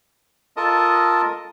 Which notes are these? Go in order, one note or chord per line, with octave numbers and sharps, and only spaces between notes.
F4 A4 A#4 D#5 A5 D#6